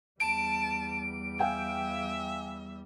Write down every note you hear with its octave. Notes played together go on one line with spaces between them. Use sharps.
E2 G3 A5 D7
E5 F5 G5 G#5